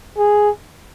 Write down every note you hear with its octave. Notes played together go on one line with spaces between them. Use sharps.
G#4